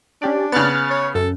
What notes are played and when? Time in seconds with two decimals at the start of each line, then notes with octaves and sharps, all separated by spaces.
0.22 C#4 D4 G4 D5
0.52 C#3 B3 F6 F#6 A6
0.90 C#5
1.15 F#2 A4